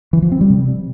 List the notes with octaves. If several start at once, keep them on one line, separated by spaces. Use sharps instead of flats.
E3
F3
C4
G3
C3